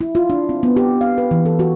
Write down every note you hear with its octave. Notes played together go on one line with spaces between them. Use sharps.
E4
F4
D4
C4
B3
G4
F5
B4
E3
A4
F#4